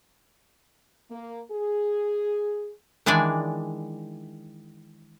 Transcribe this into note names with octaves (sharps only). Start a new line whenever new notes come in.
A#3
G#4
D#3 E3 G#3 D4 D5